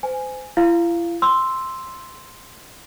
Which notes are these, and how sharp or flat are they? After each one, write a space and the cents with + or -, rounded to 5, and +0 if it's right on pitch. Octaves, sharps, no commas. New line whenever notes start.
C5 -35 G#5 +0
E4 +45 F5 -10
C6 +0 E6 +0